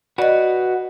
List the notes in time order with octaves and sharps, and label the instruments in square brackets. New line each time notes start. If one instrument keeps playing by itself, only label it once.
[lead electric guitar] F#4 B4 [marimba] D5 D#5